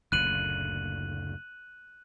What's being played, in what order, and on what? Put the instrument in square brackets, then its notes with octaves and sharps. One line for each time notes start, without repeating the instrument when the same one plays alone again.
[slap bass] F#1 D2 A#2 [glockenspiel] F#6 D#7 F#7